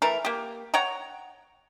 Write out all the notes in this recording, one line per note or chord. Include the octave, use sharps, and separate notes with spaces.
E3 A3 A#4
A#3 G4
C#5 F#5 G5 A#5